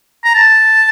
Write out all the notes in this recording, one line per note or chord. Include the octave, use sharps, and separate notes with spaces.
A#5
A5